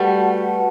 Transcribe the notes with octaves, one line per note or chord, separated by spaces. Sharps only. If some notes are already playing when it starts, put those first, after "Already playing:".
Already playing: G3 A3 F#4 B4 F#5 A5